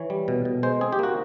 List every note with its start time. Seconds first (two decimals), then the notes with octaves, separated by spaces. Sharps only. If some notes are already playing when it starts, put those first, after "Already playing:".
Already playing: E3 C#5
0.10 G3
0.28 B2
0.45 B2
0.63 G#3 C5
0.81 C4 G#4
0.93 G4
0.99 A#3 F#4